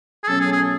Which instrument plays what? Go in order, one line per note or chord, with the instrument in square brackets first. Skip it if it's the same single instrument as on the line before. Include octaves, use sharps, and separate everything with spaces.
[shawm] G#4
[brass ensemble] B2 F#3 A3 C#4 [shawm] A4
[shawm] G#4
G#4